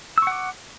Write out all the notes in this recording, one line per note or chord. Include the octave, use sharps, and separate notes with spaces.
F#5 C#6 D6 E6